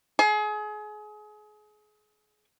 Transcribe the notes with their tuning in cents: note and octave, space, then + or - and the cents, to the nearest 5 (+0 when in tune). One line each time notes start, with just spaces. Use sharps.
G#4 +30